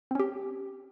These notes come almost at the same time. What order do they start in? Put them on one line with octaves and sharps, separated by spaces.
C4 C#4 G4